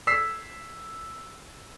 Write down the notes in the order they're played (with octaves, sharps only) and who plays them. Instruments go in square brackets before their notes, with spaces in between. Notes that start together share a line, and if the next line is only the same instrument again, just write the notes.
[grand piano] E6 B6 C7